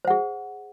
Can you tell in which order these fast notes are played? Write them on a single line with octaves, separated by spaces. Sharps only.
C5 F#5 G#4